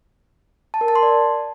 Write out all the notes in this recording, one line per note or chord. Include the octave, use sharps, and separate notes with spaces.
A5
A#4
A5
C6
D5